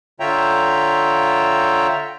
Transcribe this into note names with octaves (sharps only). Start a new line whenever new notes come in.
D3 F4 C#5 E5 G5 A#5